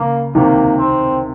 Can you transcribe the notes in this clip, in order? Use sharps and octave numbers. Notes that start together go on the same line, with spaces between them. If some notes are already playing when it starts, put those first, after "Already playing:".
Already playing: C#3 A#3
C3 D#3 A#3
C4